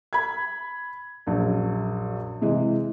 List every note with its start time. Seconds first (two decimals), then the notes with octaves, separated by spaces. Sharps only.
0.13 B5 G#6
1.27 A#1 F#2
2.41 C3 E3 G#3